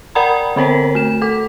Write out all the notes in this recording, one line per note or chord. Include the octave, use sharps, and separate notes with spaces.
A#4 D5 F#5 A#5 B5
D3 C4 A#4 C5 C#5
A3 E7
A4 D6